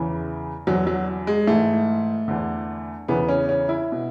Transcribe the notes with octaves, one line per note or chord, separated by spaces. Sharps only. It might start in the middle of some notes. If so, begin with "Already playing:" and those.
Already playing: E2 C#3 E3
E2 D3 F#3
F#3
G#3
G#2 E3 A3
E2 D3
E2 C#3 E3 B3
C#4
C#4
E4
B2